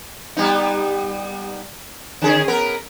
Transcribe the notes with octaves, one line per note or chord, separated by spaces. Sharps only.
G3 B3 D#4
D3 C#4 G#4
B3 A#4